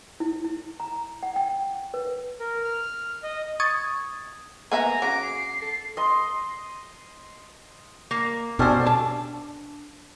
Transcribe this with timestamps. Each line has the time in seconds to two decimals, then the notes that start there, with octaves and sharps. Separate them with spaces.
0.20 E4
0.45 E4
0.80 A#5
1.23 F#5
1.36 G5
1.94 B4
2.40 A#4
2.64 F6
3.23 D#5
3.60 C#6 D#6 G#6 A6
4.72 A#3 B3 E5 G#5 A#5
5.02 C#3 F#3 D6 A#6
5.23 C7
5.62 A4
5.97 D#5 C6
8.11 A#3
8.59 B2 G3 C#4 D4 A4 C5
8.86 D4 A5